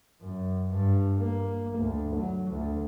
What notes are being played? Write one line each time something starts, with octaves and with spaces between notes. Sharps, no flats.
F#2
G2
A#3
D2
F#3
D2